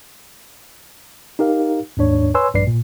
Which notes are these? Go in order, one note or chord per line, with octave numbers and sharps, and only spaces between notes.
D#4 G4 A#4 F5
D#2 G#2 D4 C#5
B4 C#5 G#5 C6 E6
A#1 G2 B4 D5 C7
A#2